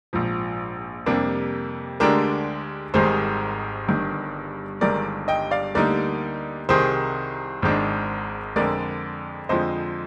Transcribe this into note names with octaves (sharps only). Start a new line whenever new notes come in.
A#1 G#2 F3
F2 C3 G3 A#3 D4
D2 D3 G#3 D4 G4 A#4
G#1 G#2 D#3 G3 G#4 C5
G1 G2 D#3
G1 G2 D#3 G#3 A#4 D5
D#5 G5
D5 F5
D2 D3 G3 A#3 D#4 A#4 D5
C2 C3 D#3 G#4 C5
G#1 G#2 D#3 G#3 D4
F2 D3 G#3 A#4 D5
F2 D3 F3 G#3 C5 D#5